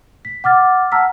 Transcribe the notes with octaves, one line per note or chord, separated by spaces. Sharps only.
B6
F#5 D6 F6 A6
F#5 A5 A#5 E6 F6 B6